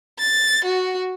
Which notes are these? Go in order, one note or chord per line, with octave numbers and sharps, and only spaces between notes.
A6
F#4